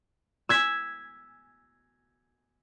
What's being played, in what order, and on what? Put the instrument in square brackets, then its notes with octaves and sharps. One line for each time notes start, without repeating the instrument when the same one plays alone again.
[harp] E6 G#6 B6